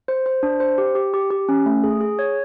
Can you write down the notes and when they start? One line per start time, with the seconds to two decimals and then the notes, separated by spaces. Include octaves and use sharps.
0.08 C5
0.26 C5
0.43 D4
0.60 C5
0.78 G4
0.95 G4
1.14 G4
1.30 G4
1.49 C#4
1.66 A3
1.84 G#4
2.01 G#4
2.19 C#5